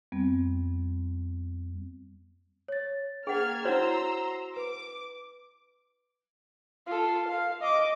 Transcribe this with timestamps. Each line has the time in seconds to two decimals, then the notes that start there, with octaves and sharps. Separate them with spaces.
0.12 F2 G3 B3 C4
2.68 C#5 A6
3.27 A#3 G#4 F#5 G5 F6 G#6 A6
3.65 E4 F#4 C5 C#5 F#5 A#5 C6 E6
4.56 B4 D6
6.87 F4 A4
7.28 F5
7.61 D#5 D6